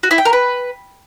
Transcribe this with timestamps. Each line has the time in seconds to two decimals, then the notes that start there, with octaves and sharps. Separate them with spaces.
0.03 F#4
0.11 E4
0.18 G5
0.25 A#4
0.33 B4